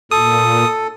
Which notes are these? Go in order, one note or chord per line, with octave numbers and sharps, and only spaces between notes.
A#2 A4 D#6